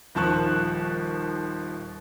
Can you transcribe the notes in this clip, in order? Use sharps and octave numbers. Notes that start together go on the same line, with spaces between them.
D#1 D#2 F3 A5 C#6 F#6